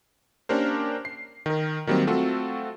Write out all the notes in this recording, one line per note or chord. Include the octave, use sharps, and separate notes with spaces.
A#3 C#4 D4 G4 A#4 C5
C7
D#3 A#4
D#3 F#3 G3 A#3 C4
A3 C4 F4 F#4 A4